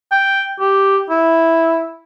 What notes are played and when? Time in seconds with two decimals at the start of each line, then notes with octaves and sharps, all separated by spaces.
0.12 G5
0.60 G4
1.10 E4